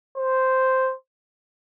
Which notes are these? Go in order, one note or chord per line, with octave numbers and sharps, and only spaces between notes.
C5